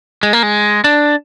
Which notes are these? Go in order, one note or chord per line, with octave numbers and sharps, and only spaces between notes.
G#3
A#3
G#3
D4